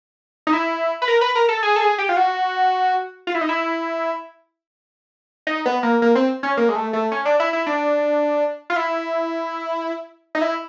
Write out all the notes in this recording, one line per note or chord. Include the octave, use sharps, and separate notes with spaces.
D#4
E4
B4
A#4
B4
A#4
A4
G#4
A4
G#4
G4
F4
F#4
F4
E4
D#4
E4
D#4
B3
A#3
A#3
C4
C#4
A#3
G#3
A3
A3
C#4
D4
E4
E4
D4
F4
E4
D#4
E4